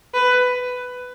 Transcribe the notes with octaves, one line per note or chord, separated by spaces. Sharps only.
B4